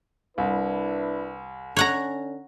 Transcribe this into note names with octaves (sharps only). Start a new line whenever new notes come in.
C2 D4 E4 B4
D3 C#4 C#5 F#5 A#5